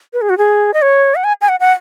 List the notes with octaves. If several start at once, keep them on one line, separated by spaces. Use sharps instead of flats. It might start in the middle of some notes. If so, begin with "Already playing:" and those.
B4
G#4
F#4
G#4
D#5
C#5
F#5
G#5
G#5
F#5
F#5